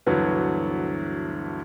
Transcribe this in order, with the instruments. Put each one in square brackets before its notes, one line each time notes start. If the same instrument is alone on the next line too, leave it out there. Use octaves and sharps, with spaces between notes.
[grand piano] D2 G2 E3 F#3 B3